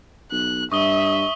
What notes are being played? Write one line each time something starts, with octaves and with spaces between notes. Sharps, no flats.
B1 F#6
G2 E5 C#6 D#6 G7